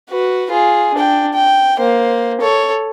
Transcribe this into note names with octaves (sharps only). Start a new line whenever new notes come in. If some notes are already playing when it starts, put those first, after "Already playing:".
F#4 B4
F4 G#4
D4 G5
G5
A#3 C5
A4 C#5